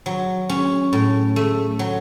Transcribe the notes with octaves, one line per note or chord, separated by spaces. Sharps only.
F#3
C#4
A2
A3
F#3